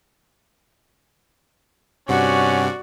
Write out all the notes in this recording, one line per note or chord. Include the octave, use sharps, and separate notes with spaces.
G2 C3 C#4 F#4 D5 F#5